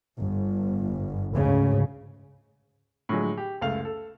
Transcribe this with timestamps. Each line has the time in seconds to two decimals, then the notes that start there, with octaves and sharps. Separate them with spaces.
0.20 G1
1.34 D2 G#2 C#3
3.09 A2 D3 F3 F#3 G#3
3.38 G4
3.61 F#1 C#2 A3 F5 F7
3.85 A4